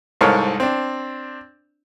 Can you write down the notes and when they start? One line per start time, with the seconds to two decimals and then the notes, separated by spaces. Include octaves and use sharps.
0.21 C2 G#2 A4 A#4 C#5 F5
0.60 C4 D4